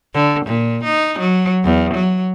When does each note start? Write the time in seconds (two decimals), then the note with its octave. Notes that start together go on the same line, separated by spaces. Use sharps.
0.14 D3
0.46 A#2
0.84 D#4
1.19 F#3
1.64 E2
1.94 F#3